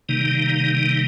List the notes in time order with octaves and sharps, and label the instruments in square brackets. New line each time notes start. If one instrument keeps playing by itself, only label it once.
[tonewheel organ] C3 D#3 G3 A#3 D#4